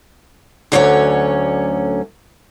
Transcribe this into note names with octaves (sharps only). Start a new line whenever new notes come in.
D2 D3 F#3 A3 C#4 C#5